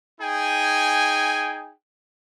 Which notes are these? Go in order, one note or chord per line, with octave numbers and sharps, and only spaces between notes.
D#4 G#4 G5 G#5